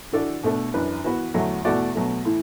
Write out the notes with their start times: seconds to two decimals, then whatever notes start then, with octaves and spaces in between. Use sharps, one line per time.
0.12 E3 D4 F#4 A4 D5
0.43 B2 A3 D4 A4
0.74 F#2 E3 D4 B4
1.04 E3 B3 F#4 B4
1.34 E2 D3 F#3 A3 E4
1.65 E2 B2 A3 F#4 D5
1.95 B2 F#3 A3
2.25 A2 E3